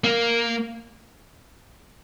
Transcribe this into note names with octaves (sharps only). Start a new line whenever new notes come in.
A#3